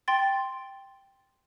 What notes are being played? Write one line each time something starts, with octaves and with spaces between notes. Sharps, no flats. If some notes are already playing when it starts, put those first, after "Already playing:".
G5 C6 A6